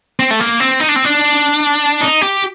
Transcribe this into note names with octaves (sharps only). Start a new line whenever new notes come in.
C4
A3
A#3
C4
D#4
D4
C4
D4
D#4
G4